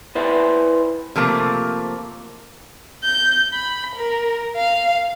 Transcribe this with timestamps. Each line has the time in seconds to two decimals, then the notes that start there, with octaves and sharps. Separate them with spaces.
0.15 E4 B4 C5 D5 E5
1.16 C3 F3 A3 A#3
3.04 G6
3.53 B5
3.95 A#4
4.56 F5